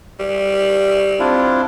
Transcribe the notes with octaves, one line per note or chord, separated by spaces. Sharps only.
G3
C4 D4 E4 F4